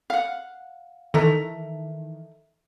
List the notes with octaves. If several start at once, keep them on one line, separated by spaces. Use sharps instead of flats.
F5 F#5
D#3 E3 A4 E5 A#5